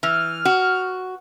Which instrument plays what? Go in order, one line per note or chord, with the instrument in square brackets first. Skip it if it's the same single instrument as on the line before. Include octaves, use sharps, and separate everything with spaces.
[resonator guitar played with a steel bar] E3 [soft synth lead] F6
[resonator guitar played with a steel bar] F#4